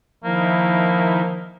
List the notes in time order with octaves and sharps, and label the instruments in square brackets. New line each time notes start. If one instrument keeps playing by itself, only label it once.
[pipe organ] D#3 D#4 E4 [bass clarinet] F3 [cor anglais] A#3